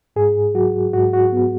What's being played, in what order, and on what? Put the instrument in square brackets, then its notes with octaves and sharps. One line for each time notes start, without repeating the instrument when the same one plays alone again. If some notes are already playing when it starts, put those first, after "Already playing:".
[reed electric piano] G#2 G#4
F#3 F#4
G#2 F#4
F#4
B3